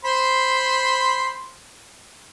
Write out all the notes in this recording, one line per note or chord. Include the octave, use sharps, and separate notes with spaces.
C5 B5 C6